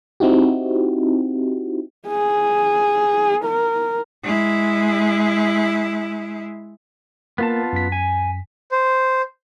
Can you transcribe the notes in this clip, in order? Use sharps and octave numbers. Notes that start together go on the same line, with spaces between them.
C4 D#4 E4 F#4 G4
G#4
A#4
G#3 E4
A#3 B3 F4 A#4 A5
F#2 B6
G#5
C5